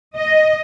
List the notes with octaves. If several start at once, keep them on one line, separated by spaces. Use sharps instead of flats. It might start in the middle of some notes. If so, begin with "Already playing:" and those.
D#5